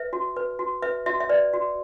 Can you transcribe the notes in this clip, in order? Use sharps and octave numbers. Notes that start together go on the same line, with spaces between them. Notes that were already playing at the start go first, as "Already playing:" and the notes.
Already playing: B4 E5
F#4
B4
F#4
B4 E5
F#4 E5
E5
B4 D5
F#4